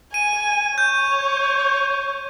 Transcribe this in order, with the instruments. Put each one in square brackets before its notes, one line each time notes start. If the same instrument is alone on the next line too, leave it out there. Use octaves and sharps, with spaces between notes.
[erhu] G#5 [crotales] D#7
[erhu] C#5 [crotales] G6